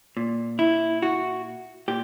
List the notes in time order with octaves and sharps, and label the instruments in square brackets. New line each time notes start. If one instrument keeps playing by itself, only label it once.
[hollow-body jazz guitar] A#2
E4
F#4
A#2 G4